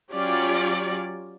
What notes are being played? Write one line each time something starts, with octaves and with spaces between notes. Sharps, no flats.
F#3 C#4 F4 G4 D5